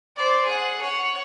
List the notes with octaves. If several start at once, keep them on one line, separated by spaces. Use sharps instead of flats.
C5 D5
G#4 F#5
C#5 F#5